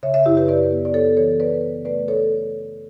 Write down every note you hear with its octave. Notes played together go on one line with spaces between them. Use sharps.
C#3 C#5 E5
C#5 E5
F#2 E4 G4
G4 B4
F#2 B4 D5
B3
D5
B3 A4 C#5
E3 A4 C#5
B3 B4 D5
C#3
A3 B4 D5
A4 C#5